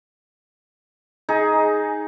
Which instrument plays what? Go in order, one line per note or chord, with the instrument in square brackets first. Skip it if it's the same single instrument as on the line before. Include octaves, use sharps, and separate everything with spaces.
[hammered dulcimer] D#4 G#4